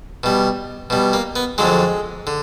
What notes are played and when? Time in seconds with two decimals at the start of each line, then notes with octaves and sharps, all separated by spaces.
0.24 B2 G3
0.90 B2 G3
1.13 A#3
1.36 B3
1.58 F2 D3 F#3 G#3
2.27 D3